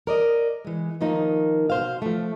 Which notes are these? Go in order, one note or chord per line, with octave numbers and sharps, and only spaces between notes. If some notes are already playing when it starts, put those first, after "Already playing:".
A#4 D5 D#5
E3 G#3
D#3 F3 A#3 D#4
B2 C5 F5
F3 A3